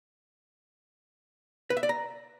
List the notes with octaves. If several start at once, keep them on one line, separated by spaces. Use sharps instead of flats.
B4
E5
D5
A#5